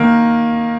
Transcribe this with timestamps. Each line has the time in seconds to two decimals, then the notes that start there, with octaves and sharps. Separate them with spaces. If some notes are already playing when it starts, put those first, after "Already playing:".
Already playing: D#3 A#3